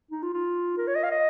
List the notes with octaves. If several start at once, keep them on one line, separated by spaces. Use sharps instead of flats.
D#4
F4
F4
A#4
C#5
D#5
F5
D#5